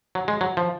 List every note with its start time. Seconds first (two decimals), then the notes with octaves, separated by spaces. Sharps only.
0.15 F#3
0.28 G#3
0.41 F#3
0.57 F3